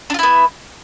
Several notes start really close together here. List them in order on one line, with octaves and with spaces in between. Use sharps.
D4 F4 E4 B3